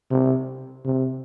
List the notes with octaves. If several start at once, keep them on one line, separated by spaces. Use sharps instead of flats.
C3
C3